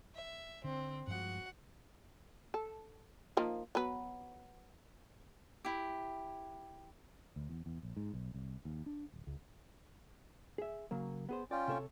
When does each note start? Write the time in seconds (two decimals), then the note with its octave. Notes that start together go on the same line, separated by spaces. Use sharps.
0.15 E5
0.64 D3 C4
1.07 G2 F3 G#3 F#4 F#5
2.54 A4
3.37 F3 A#3 D#4
3.75 F#3 B3 B4
5.65 E4 G4
7.36 D2
7.49 E2
7.66 E2
7.83 A#1
7.97 G#2
8.13 B1
8.34 C2
8.65 D#2
8.86 D4
9.13 D1
9.27 C#2
10.58 G#4 E5
10.91 C#3 F#3 A#3
11.29 B3 G#4 C5
11.51 C#4 F4 D5 G5
11.68 C3 A4 C#5